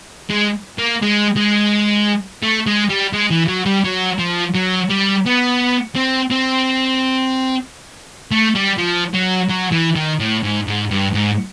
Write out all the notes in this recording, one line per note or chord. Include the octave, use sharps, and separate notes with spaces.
G#3
A#3
G#3
G#3
A3
G#3
G3
G#3
E3
F#3
G3
F#3
F3
F#3
G3
B3
C4
C4
A3
G3
F3
F#3
F#3
E3
D#3
A2
G#2
G#2
G2
G#2